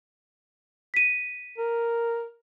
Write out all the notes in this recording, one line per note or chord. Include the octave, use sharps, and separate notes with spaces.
B6 D#7
A#4